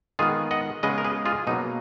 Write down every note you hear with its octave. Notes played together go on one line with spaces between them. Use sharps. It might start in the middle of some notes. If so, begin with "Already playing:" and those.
D#3 G#3 B3 F4 G#4
D#5 F#5
C#3 G#3 B3 B4 D#5
A#4
G#4 B4
F4 G#4
B2 F#3 A#3 D#4